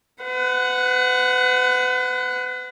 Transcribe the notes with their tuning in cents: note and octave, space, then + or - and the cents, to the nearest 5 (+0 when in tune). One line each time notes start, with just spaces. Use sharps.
B4 +40 F#5 +0